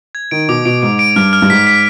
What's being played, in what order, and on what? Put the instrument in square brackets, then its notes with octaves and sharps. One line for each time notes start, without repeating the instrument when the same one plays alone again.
[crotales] G#6
[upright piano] D#3 [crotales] D7
[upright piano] B2 [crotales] D6
[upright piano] B2 [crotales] D7
[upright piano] G#2 [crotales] D7
[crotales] D7
[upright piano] G2 [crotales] F6
[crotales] F6
[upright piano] G2
[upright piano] G#2 [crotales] B6
[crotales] B6